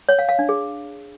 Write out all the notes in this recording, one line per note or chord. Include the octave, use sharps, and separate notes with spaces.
C#5
F5
F5
D4
G#4